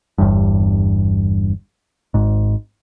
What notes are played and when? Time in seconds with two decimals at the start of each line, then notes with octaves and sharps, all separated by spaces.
0.18 G1 E2 G2
2.14 G#1 G#2